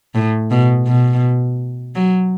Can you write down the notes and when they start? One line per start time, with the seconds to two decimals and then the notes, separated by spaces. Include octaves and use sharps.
0.15 A2
0.51 B2
0.87 B2
1.95 F#3